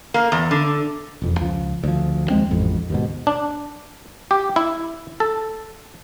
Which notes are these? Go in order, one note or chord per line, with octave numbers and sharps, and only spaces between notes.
A#3
E2
D3
E1 F2
C#2 F3
D2 F3
D#2 F3 G#3 C4
A1 F2 G#2
D#2 G#2 B2
D4
G4
E4
A4